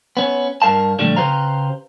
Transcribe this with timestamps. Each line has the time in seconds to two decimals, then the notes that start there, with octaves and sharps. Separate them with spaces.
0.17 B3 C#4
0.62 G2 A#4 F5 A5
0.99 A#2 D3 F3 G3 A3
1.17 C#3 G4 B4 C5 F5 A#5